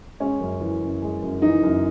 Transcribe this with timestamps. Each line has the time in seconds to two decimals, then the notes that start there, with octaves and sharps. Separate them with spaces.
0.20 G#3 C#4
0.40 F#2
0.61 E3
0.81 F#2
1.02 G#3
1.22 F#2
1.42 E3 D#4
1.63 F#2